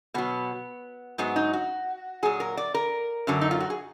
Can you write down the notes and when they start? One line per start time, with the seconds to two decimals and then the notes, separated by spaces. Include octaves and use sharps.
0.14 B2 F#3 B3
1.18 G#2 F#3 B3
1.36 D#4
1.53 F#4
2.23 A#2 F#3 G#4
2.40 A#4
2.57 D5
2.74 A#4
3.27 F#2 D3 F#3
3.41 D#4
3.51 F4
3.60 F#4
3.70 G#4